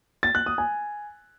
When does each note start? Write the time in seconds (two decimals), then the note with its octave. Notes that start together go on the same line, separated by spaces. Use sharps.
0.23 A6
0.35 F#6
0.46 D#6
0.58 G#5